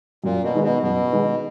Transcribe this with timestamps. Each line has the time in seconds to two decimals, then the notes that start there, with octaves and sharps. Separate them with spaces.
0.24 F#2 A#2
0.44 B2
0.54 D#3 G#3 B3
0.64 B2
0.83 F#2 B2
1.12 D#3 G#3 B3